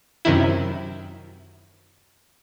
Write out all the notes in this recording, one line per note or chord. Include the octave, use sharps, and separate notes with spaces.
F#2 C3 D#3 E4